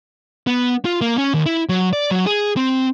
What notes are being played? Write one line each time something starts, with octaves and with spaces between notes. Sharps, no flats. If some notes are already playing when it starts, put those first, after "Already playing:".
B3
F4
A#3
C#4
D#2
E4
F#3
D5
F#3
G#4
C4